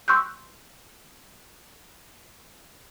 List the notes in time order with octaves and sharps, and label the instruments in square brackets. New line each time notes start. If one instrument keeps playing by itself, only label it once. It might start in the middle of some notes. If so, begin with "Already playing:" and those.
[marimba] C6 C#6 E6 F#6 G6